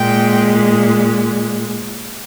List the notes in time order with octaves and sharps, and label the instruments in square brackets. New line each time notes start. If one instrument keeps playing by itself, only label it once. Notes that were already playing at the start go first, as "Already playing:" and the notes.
Already playing: [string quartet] A#2 G#3 G5